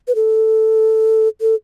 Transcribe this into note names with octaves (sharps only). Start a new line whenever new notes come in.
B4
A4
A4